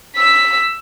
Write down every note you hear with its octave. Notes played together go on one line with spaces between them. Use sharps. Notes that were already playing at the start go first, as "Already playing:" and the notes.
E6 B6